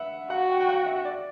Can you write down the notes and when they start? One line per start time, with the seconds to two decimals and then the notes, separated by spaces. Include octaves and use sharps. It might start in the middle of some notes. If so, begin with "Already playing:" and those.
Already playing: B4 E5 F#5
0.30 F#4 F#5
0.50 G5
0.60 G5
0.69 F#5
0.86 E5
1.05 D5